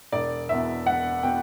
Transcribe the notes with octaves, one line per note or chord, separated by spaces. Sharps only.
E1 D5
E2 B2 E5
E1 F#5
B2 G5